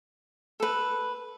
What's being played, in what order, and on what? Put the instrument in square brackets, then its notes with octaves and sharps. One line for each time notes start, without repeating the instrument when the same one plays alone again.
[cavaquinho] A4 B4